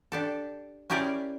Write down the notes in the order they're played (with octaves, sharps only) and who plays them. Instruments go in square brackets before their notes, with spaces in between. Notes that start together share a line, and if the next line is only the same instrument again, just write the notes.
[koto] D4 G4 A4
C#4 E4 G4 G#4 A#4 D5